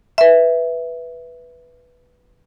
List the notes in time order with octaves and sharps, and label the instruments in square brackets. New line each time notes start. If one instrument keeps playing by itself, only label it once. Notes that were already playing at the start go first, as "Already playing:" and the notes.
[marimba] B4 E5